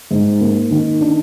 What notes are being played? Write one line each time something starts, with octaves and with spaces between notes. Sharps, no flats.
G#2
A#3
D#3
D4